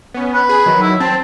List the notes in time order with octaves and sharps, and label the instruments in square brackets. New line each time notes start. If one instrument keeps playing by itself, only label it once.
[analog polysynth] B3 C#4
[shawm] B4
[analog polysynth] G#4
D#3 F#3
[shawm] E4
[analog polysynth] C4 [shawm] A5